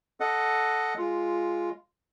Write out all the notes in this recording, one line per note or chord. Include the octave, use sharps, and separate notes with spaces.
A4 D#5 F#5
G#3 F4